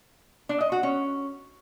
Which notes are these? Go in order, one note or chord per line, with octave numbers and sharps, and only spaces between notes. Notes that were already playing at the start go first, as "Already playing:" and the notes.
D4
D#5
F#4
C#4